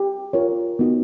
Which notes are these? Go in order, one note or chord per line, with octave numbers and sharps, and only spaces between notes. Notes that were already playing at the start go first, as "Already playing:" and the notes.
Already playing: G4
F4 A#4 C#5
B3 D#4 F#4